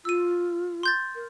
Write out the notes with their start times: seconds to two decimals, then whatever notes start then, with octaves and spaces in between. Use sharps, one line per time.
0.05 F4 E6 D#7
0.83 C6 G6 A6
1.15 A#4